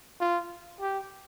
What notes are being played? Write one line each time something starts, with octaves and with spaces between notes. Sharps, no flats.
F4
G4